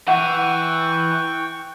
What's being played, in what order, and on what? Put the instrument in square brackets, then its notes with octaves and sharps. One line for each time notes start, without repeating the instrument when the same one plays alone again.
[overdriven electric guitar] E3 [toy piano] F#5 [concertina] G5 C#6